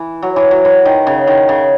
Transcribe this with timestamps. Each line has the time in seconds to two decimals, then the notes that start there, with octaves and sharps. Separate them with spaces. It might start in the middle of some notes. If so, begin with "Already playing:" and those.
Already playing: E3
0.23 F#3
0.36 E3
0.51 F#3
0.65 E3
0.86 D#3
1.07 C#3
1.27 D#3
1.49 C#3